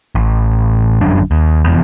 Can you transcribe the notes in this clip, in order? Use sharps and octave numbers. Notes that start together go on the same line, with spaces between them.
A1
G1 F#2 D4
D#2
F1 E2